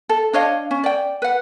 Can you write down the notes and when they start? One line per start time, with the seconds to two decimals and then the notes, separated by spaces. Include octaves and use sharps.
0.09 A4
0.33 D4 C#5 D#5 F5
0.71 C#4
0.84 D5 G5
1.22 B4 F#5